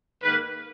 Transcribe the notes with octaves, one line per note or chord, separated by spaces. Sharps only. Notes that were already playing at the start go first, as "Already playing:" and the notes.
G#2 D#3 A#3 B4